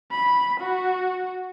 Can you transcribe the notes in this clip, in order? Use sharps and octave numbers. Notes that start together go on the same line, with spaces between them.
B5
F#4